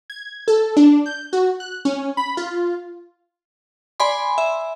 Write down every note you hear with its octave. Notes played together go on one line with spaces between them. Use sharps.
G#6
A4
D4
G6
F#4
F#6
C#4
B5
F4
D5 G#5 B5 C6
E5